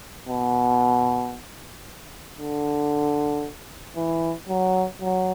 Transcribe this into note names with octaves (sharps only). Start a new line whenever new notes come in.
B2
D3
E3
F#3
F#3